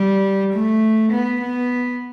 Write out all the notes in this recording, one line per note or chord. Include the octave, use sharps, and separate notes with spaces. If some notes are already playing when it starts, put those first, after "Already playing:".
Already playing: G3
A3
B3
B3